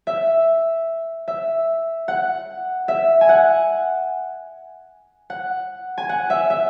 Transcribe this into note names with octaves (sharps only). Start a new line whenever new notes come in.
E5
E5
F#5
E5
G#5
F#5
F#5
G#5
F#5
E5
E5